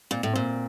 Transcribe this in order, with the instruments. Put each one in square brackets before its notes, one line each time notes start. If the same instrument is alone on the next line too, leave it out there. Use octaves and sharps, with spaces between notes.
[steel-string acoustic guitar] A#2 [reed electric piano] C4
[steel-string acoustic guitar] A2
[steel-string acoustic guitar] A#2 [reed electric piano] C4